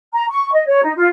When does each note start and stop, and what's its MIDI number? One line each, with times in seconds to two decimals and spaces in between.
0.13 0.25 82
0.30 0.50 85
0.53 0.64 75
0.66 0.83 73
0.84 0.92 63
0.97 1.07 65